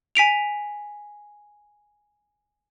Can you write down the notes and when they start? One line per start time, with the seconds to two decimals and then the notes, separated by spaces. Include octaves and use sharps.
0.15 G#5 B6 D7 F7